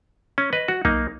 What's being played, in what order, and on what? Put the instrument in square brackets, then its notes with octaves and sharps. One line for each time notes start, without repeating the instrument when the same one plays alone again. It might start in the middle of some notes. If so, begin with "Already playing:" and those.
[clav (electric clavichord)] C#4
B4 D#5
F#4
[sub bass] B1 [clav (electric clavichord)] A#3 D#4